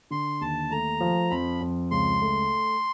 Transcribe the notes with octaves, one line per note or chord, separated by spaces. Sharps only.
D3 C6
D#2 A5
A3 A#5
F3
F2 B5
F2
C#2 C6
A3